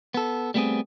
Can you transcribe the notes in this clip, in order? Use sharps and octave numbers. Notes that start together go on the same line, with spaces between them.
B3 A4
G3 A3 B3 C4 G#4